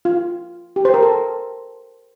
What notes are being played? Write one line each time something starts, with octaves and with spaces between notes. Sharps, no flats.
F4
G4
C5
A#4
A4